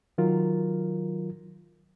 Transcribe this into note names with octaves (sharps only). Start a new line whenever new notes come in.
D#3 F#3 F4 A#4